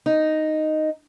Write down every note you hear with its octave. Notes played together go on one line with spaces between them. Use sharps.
D#4